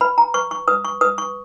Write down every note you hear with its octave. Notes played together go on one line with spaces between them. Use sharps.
B4 B5
A#5
B4 C#6
C#6
B4 D#6
C#6
B4 D#6
C#6